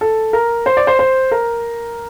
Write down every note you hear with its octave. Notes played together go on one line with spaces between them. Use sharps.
A4
A#4
C5
D5
C5
C5
A#4